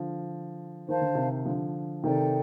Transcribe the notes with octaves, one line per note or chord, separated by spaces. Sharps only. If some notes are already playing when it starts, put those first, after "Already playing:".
Already playing: D3 F3
D#3 C5 F5 A5
D3
C3 D#3
D3 F3
C3 D#3 D#4 A4 D5 G5